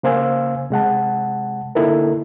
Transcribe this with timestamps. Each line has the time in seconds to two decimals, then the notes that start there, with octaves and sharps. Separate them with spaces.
0.03 C#3 A#3 C5 F5 G#5 E6
0.70 C3 G#3 F#5 A5
1.75 D3 A#3 D#4 E4 A4 A#4